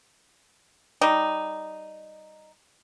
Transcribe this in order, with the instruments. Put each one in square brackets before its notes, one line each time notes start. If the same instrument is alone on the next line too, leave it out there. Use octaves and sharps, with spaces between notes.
[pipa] G3 D#4